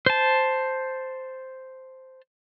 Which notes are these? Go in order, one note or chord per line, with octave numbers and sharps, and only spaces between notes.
C5 A5